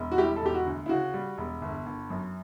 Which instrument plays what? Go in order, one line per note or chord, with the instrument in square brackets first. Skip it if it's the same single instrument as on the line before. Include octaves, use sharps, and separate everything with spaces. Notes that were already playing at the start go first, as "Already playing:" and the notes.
Already playing: [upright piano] E1
[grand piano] F#4
[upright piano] G3 [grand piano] E4 G4
[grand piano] A4
[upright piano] E1 [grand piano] G4
[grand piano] F#4
[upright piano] D2
[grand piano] E4
[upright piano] C#3 [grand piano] F#4
[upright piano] G3
E1
G1
G1
F#2